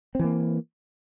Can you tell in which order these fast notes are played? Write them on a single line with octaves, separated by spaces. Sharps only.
C4 E3 A#3